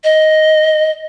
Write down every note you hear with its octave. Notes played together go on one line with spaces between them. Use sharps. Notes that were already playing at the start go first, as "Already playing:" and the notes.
D#5